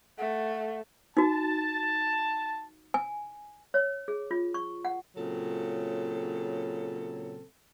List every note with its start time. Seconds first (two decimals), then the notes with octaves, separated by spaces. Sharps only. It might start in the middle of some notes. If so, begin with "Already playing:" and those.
0.18 A3 F#5
1.17 D#4 F#4 A5
2.94 G#5
3.74 C#5
4.08 G#4
4.31 F4
4.54 C#6
4.85 F#5
5.16 A#2 C#3 F#3 C4 A4